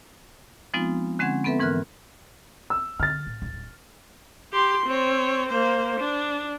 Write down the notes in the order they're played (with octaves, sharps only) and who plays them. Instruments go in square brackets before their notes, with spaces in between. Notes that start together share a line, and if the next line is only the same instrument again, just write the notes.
[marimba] F3 G#3 B3 C4 D#4 F4
D3 G#3 C4 C#4 F#5 G#6
B3 C4 A4 B4 E5
G#2 E3 A#4 F6 F#6
[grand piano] E6
[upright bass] D3 [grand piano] F6 A6
[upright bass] A2
D1 D#2
[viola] G4 C6
C4 C#5
A#3 C5
D4